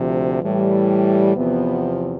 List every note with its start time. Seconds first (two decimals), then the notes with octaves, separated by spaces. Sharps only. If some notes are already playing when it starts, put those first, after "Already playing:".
Already playing: D2 C3 F3
0.44 A2 E3 G3
1.36 E2 C3 F3 B3